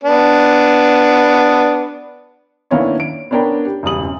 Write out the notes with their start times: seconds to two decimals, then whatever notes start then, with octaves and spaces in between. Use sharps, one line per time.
0.04 B3 D4
2.71 D#3 A#3 B3 C#4 D4 E4
3.00 D7
3.31 B3 C#4 D4 A#4 G5 B5
3.66 G4
3.83 E1 G2 C#3 D#6 F#7
4.03 F#2